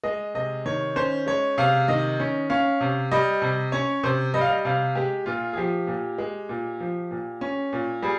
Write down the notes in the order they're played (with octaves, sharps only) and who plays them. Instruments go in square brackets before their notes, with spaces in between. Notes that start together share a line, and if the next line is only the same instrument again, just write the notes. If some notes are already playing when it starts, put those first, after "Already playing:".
[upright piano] G#3 D#5
C3 D#5
D#3 C#5
C#4 C5
G#3 C#5
C3 F5
D#3 D#5
C#4
C#4 F5
C3
G3 D#5
C3
C#4 C#5
C3 C5
G3 D#5
F5
D#5
C3 F5
G#3 G4
A#2 F4
G#4
F3 G4
A#2
G#3
A#2
F3
A#2
C#4
A#2
G3 G#4